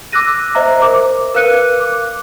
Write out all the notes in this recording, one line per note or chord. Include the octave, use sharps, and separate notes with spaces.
D6 E6 F#6 A#6 D#7
C5 D#5 E5 A#5
A#4 C5 D6
A#4 B4 F5 F#6 C#7 D#7
D6